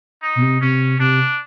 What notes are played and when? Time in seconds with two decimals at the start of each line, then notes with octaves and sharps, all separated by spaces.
0.22 D#4
0.36 B2
0.42 C3
0.61 C3 C#4
0.99 C3 D4